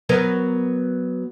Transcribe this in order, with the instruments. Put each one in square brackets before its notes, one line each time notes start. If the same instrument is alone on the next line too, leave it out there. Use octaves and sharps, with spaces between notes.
[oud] F#3 B3 A#4